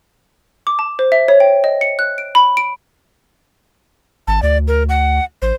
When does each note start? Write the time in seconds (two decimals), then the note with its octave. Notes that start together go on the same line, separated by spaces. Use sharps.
0.67 D6
0.79 A5
0.99 C5
1.12 E5
1.28 C#5
1.40 G5
1.64 D#5
1.81 C#7
1.99 F#6
2.18 D7
2.35 B5
2.57 D7
4.27 G#1 A5
4.43 D2 D5
4.68 A#4
4.89 F#5
5.42 A1 C5